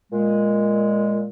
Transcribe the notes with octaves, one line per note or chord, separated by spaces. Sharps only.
A#2 G#3